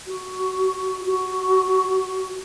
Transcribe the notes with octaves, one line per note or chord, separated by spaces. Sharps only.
F#4
F#4